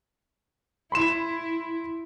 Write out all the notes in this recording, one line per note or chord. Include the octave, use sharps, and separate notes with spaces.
E4 B5 C6 E7